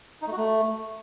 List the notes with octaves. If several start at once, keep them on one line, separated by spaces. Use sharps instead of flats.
D#4
A3
F#4
A3